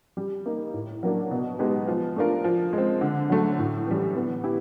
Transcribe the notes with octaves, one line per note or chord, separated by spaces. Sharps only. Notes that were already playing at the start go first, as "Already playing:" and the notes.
G3
A#3 D#4
A2
F#3 A#3 D4
B2
G#3 B3 D#4 G4
F3
A3 D4 F4 A#4
F3
G#3
C4
D3
F#3 A3
A2
E3 G3
B3
E4 G4